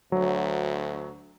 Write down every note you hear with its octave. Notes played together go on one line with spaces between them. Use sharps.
D2 F#3